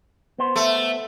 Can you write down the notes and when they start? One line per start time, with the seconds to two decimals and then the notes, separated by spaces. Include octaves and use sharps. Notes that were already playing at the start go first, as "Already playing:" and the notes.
0.38 B3 C5
0.56 A3